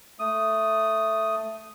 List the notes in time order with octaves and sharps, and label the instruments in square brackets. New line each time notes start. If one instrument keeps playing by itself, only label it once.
[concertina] A3 D#6